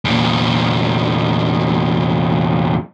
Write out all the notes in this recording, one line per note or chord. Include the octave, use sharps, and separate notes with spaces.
E2 A#2